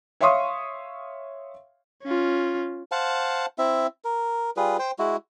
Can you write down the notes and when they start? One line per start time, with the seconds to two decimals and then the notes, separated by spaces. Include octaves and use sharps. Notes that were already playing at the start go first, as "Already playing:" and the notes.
0.21 C#5 E5 F5 C6 C#6 D#6
2.03 C#4 F4
2.92 C5 F5 F#5 A5
3.58 C4 E4 E5
4.05 A#4
4.57 G3 F4 G#4 B4
4.79 C5 G5
4.99 G#3 E4 F#4